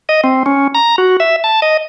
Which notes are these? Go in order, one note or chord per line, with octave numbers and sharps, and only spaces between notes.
D#5
C4
C#4
A#5
F#4
E5
A5
D#5